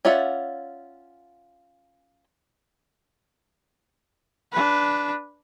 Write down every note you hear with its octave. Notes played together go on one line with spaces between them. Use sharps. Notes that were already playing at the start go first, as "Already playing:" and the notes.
C#4 F4 D5 E5 F#5
D4 B4